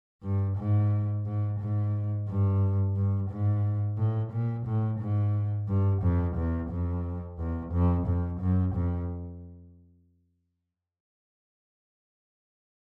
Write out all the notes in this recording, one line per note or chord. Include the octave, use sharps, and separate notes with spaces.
G2
G#2
G#2
G#2
G2
G2
G#2
A2
A#2
A2
G#2
G2
F2
E2
F2
E2
F2
F2
F#2
F2